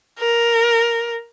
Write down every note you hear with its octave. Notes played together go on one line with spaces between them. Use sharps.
A#4